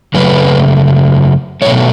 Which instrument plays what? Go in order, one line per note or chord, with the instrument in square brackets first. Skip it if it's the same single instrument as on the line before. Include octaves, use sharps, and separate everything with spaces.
[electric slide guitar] F#2 C#3 F#3 A3 B4
B2 F#3 A3 C#5